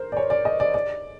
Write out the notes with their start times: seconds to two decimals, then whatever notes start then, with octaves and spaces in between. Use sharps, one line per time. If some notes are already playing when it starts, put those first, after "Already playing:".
Already playing: A#4 C5
0.12 D5
0.17 C#5
0.30 D5
0.45 D#5
0.60 D5
0.74 D5